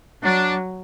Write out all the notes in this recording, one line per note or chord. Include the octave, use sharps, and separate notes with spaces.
F#3 D4